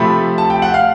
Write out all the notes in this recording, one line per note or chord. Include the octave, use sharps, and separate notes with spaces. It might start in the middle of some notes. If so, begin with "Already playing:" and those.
Already playing: C3 F3 A3 B5
A5
G5
F#5
F5